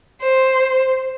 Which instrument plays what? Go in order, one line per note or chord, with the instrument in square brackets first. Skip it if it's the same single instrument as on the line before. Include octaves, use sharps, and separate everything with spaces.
[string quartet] C5